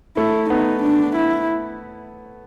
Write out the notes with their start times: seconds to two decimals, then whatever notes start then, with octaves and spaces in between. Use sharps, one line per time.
0.17 A3 E4
0.50 B3 D#4
0.83 D4
1.16 E4